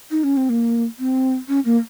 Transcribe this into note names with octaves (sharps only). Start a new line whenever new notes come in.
D#4
C#4
C4
A#3
C4
C#4
A#3